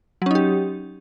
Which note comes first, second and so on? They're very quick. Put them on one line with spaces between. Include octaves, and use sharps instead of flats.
F#3 C#4 D#4 G4